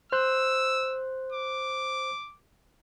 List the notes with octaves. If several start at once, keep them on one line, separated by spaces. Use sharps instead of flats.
C5 E6 F#6
D6